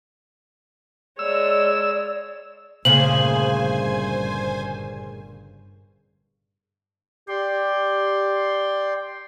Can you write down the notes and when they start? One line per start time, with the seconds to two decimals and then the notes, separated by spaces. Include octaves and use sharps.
1.19 G#3 C#5 D5 E6
2.85 G1 G2 A#2 C#3 A3 C5 G#5 F#7
7.28 G4 D5 G5 C6